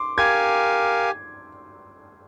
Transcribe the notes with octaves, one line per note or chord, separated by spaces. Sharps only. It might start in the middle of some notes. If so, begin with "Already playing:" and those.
Already playing: C6 D6
G4 A#4 F5 G#5 G#6